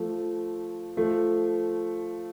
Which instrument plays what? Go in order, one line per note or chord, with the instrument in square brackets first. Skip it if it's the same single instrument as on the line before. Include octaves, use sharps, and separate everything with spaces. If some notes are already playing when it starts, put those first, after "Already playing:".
Already playing: [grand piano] F3 A3
F3 A3